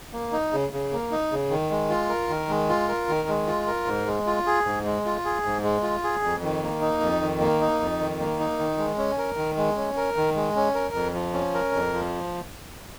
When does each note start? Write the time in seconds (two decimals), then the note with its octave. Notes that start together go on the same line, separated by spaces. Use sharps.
0.13 A#3
0.32 D#4
0.53 C#3
0.73 C#3
0.92 A#3
1.11 D#4
1.32 C#3
1.50 D#3
1.70 G#3
1.90 F4
2.09 A#4
2.29 D#3
2.49 G#3
2.69 F4
2.88 A#4
3.09 D#3
3.28 G#3
3.47 F4
3.67 A#4
3.86 G#2
4.06 G#3
4.27 F4
4.46 G#4
4.65 G#2
4.85 G#3
5.05 F4
5.25 G#4
5.45 G#2
5.63 G#3
5.83 F4
6.04 G#4
6.23 F2
6.43 D#3
6.63 A#3
6.81 D#4
7.01 F2
7.21 D#3
7.40 A#3
7.61 D#4
7.80 F2
8.00 D#3
8.20 A#3
8.40 D#4
8.59 D#3
8.78 G#3
8.98 C#4
9.18 A#4
9.37 D#3
9.57 G#3
9.77 C#4
9.97 A#4
10.17 D#3
10.36 G#3
10.56 C#4
10.75 A#4
10.95 F2
11.14 F3
11.33 C#4
11.54 A#4
11.73 F2
11.94 F3